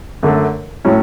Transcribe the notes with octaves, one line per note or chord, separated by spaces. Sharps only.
F#2 D3 A3
A2 F#3 C#4 E4